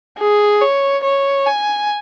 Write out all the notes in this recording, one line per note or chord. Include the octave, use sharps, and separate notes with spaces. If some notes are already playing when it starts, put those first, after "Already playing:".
G#4
C#5
C#5
G#5